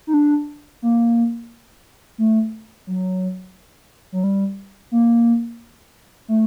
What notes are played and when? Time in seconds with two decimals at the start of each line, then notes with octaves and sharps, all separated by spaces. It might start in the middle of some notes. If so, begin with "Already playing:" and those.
0.07 D#4
0.14 D4
0.82 A#3
2.18 A3
2.87 F#3
4.12 F#3
4.24 G3
4.91 A#3
6.28 A3